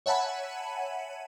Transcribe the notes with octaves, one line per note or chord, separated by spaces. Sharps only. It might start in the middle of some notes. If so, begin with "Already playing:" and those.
C#5 E5 F#5 G#5 A5 B5